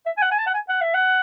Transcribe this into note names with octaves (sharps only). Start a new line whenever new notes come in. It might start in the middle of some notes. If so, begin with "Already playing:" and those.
E5
G#5
F#5
G#5
A5
F#5
G#5
F#5
E5
F#5